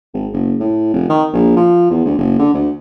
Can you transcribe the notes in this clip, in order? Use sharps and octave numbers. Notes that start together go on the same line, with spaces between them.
G#1
F#1
A2
F1
D#3
A#1
F3
E2
D2
F#1
D3
D2